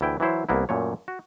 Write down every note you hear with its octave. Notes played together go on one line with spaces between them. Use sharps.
D2 E3 E4 G5
E3 F#3 E4 C5
C2 A#3 B3 E4
F#2 A#2 A3 C#5
F#4